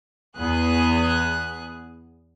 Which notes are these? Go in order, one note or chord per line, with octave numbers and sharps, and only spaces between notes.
E2 B3 G#4 F#6